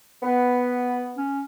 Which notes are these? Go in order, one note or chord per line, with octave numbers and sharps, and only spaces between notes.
B3
C#4